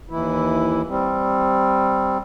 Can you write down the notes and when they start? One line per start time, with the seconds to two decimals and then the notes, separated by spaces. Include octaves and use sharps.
0.10 D#2 E3 E4
0.89 G3 C4